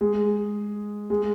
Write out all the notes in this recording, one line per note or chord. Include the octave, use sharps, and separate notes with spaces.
G#3
G#3